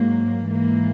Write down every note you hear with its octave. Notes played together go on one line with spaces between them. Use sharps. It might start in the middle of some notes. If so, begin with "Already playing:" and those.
Already playing: G#2 F#3 A#3
G#2 E3 A#3